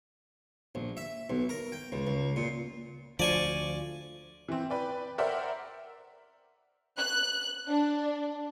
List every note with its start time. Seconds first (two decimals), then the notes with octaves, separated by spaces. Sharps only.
0.75 A#1
0.97 E5
1.30 B1
1.49 A#4
1.72 G5
1.92 C#2
2.07 C#2
2.36 A#2
3.19 D2 F3 D5 G#5 C#6
4.48 E3 C4
4.70 B4 D5 G5
5.18 A#4 C5 D5 E5 F#5 G5
6.98 F#6
7.69 D4